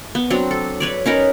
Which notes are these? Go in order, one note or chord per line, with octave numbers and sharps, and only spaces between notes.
B3
F#3 C4 D4
A4
B4 C#5 D5
C#4 D#4 A#4 B4